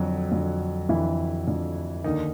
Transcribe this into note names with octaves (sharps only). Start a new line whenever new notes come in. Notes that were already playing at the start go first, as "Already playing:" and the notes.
Already playing: F2 D3 F#3 F#4
F2 D3
F2 D3 E3 E4
F2 D3
D#2 D3 D#3 D#4